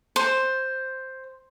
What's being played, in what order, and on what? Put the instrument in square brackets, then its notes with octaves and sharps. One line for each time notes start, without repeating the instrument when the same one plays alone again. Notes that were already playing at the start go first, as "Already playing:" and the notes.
[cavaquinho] C5